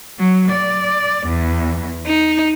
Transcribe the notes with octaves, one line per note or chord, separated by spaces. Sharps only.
F#3
D5
E2
D#4